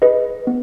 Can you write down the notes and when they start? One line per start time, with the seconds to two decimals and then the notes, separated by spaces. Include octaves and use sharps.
0.02 G#4 B4 D#5
0.47 B3